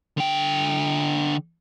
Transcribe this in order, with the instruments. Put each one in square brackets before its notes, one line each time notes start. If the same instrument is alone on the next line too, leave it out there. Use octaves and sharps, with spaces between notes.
[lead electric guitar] D3 G5